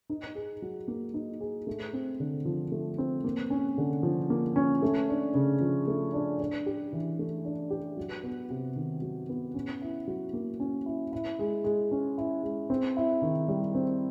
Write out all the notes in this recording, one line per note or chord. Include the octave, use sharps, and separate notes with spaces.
D#4
G#4
F#3
A#3
D#4
G#4
A3
C4
D3
F3
A3
C4
A#3
C#4
D3
F3
A#3
C#4
A3
D4
C#3
F3
A3
D4
D4
G4
E3
A3
D4
G4
F#3
B3
C3
D#3
F#3
B3
C#4
E4
F#3
A#3
C#4
E4
E4
G#3
G#3
C#4
E4
G#3
C4
E4
D#3
G3
C4